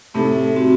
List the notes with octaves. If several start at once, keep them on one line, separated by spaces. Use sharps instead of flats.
A2 C3 A3 D#4 A4
A3 C4 F#4